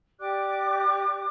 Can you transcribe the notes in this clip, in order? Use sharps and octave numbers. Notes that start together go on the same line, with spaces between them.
G4 D5 D6 F#6